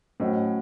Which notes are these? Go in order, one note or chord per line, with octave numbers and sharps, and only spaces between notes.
A2 F#3 C#4 F#4 C5 D#5